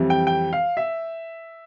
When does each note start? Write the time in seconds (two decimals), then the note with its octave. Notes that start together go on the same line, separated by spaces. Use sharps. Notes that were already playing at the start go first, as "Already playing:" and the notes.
Already playing: F2 E3 G3
0.10 G5
0.27 G5
0.53 F5
0.77 E5